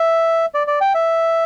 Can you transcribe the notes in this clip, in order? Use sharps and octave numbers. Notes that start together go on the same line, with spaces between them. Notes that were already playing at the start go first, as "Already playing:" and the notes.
Already playing: E5
D5
D5
G5
E5